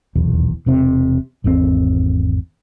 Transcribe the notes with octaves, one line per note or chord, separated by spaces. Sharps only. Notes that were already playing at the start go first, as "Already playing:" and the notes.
D#1 B1 E2
E1 C3 C4
G#1 E2 D#3 C4